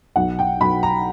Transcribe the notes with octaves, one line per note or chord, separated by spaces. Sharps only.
B1 F#5
G5
B1 B5
A#5